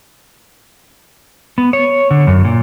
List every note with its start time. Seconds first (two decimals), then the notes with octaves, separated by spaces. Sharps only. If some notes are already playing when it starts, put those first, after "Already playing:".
1.58 B3
1.73 C#5
2.11 D3
2.27 F#2
2.45 A#2